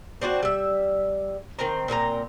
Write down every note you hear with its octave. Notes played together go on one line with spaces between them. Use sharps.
C4 D4 F4 F#4
G3 E5
D#3 C4 A#5
A#2 C4 G#4 A#5